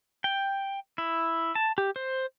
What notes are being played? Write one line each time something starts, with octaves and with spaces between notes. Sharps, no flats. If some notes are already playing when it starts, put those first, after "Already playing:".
G5
E4
A5
G4
C5